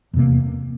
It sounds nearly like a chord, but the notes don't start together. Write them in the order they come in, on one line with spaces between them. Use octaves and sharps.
E2 C3 A#3